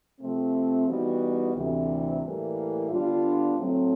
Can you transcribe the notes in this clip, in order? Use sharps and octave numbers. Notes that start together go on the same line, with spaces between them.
C3 F3 A3 C4
E3 G3 B3 D#4 F#4
D2 C3 E3
A2 E3 G3 A#3
D3 G3 B3 D4 F4
A2 F#3 A3 C4